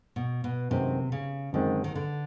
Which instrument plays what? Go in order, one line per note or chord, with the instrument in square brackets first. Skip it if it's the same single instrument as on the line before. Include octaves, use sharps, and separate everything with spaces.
[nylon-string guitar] B2
B2
[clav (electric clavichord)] F#2 D#3 G#3 C4 [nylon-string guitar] C3
[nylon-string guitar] C#3
[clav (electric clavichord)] F#2 D#3 G#3 C4 [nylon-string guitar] D3
[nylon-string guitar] D#3
D3